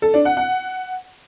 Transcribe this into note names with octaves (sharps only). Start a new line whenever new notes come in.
A4
D4
F#5
F#5